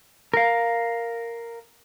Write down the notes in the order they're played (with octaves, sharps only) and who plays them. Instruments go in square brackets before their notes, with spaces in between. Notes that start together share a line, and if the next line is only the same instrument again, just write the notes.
[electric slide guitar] A#4 F5